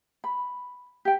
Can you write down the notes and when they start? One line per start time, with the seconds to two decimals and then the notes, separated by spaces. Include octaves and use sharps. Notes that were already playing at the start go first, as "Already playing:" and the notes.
0.24 B5
1.05 G4 G5